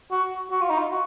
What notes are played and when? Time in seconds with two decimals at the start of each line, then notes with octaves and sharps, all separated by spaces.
0.11 F#4
0.51 F#4
0.61 F4
0.70 D#4
0.78 F4
0.91 F#4